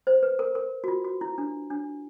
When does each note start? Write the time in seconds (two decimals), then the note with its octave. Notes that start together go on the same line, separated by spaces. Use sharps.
0.07 C5
0.23 B4
0.39 A#4
0.55 A#4
0.84 F#4
0.88 F4
1.04 F#4
1.21 E4
1.38 D4
1.70 D4